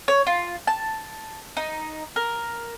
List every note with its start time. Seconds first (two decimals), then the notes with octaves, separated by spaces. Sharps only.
0.08 C#5
0.27 F4
0.67 A5
1.57 D#4
2.16 A#4